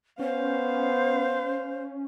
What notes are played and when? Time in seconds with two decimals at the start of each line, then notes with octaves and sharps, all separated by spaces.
0.19 B3 C#4 C5 F5